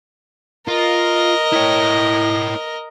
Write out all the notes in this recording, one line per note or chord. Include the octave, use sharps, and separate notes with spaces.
F4 A#4 D#5
E4 C#5